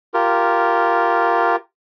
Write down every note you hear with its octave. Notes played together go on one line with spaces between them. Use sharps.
F4 G4 A#4